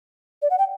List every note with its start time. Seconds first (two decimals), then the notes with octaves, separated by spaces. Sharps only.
0.42 D5
0.50 F#5
0.58 G5